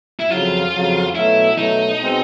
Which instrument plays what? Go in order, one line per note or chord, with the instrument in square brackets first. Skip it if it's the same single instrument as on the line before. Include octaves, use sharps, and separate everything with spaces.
[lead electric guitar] E4
[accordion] F2 C#3 F#3 [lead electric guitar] F4
[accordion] F2 C#3 F#3
[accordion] B2 F#3 A3 [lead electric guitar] E4
[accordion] B2 F#3 A3 [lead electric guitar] D#4
[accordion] B2 G#3 C4